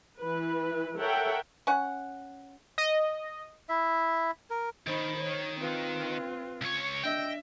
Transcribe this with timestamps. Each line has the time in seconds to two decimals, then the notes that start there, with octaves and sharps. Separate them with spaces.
0.19 E3 B4
0.98 A4 A#4 C#5 E5 F#5 G5
1.67 C#4 F#5
2.78 D#5
3.69 E4 E5
4.50 A#4
4.87 D#3 D#4 C5 B5
5.19 C#5
5.60 C4 F4 B4
6.61 C#2 C#5
7.03 D4 D#5 E5 G5